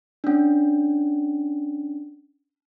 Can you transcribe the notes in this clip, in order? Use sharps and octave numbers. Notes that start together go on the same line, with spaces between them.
C#4 D4